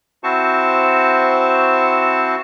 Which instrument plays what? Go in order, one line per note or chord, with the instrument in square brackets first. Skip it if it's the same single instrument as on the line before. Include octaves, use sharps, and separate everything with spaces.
[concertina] C4 E4 F#4 C5 A5 C#6